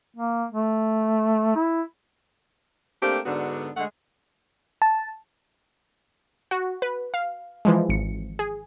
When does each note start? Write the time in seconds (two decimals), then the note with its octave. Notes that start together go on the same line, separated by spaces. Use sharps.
0.17 A#3
0.51 A3
1.56 E4
3.02 A3 A#3 C4 D4 G4
3.25 G#2 D3 B3 D4 F#4
3.76 D3 G#3 A3 A4 F#5
4.82 A5
6.51 F#4
6.82 B4
7.14 F5
7.65 E3 F3 G#3
7.89 G#1 C#7
8.39 G#4